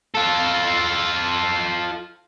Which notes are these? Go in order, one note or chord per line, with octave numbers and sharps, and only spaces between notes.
F4 A4